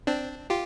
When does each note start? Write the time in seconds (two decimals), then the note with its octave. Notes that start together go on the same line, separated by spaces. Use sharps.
0.07 C4 D4
0.50 F4 G4